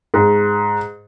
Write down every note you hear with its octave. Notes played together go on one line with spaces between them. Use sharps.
G#2